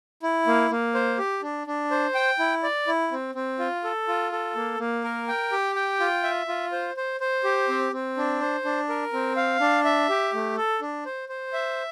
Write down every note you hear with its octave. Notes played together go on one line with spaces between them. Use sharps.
E4
A#3
A#3
C5
G4
D4
D4
C5
G5
E4
D5
E4
C4
C4
F4
A4
F4
A4
A#3
A#3
A#4
G5
G4
G5
F4
E5
F4
C5
C5
C5
G4
C4
C4
D4
C5
D4
A#4
C4
F5
D4
E5
G4
A3
A4
D4
C5
C5
E5